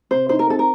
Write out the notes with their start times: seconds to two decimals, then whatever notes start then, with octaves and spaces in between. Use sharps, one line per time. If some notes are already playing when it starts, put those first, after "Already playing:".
0.11 C3 C5
0.29 D#4 C5
0.39 A#4
0.48 C4 A4
0.59 A#4